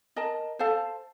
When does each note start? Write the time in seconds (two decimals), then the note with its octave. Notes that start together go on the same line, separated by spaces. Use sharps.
0.16 A#4 D#5 A5
0.59 A4 C5 F5 A5